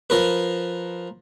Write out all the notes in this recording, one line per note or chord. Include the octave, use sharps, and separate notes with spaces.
F3 A#4 B4